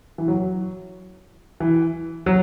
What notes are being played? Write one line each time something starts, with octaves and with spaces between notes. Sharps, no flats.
E3
F#3
E3
F#3